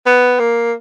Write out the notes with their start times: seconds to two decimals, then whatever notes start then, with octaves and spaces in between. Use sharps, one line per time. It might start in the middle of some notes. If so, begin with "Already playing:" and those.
0.06 B3
0.39 A#3